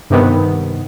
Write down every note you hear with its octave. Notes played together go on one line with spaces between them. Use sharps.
G2 C3 D#3 B3